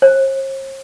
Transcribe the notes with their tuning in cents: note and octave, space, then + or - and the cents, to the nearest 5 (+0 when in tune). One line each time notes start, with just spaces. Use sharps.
C5 +45